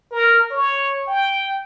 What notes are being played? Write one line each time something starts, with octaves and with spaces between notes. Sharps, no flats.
A#4
C#5
G5